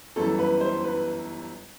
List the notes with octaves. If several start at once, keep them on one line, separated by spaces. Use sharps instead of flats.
G1 F#2 E3 A4
B4
C5
B4